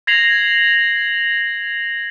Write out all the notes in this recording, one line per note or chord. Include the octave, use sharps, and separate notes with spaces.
G#6 A#6 C7 F7 F#7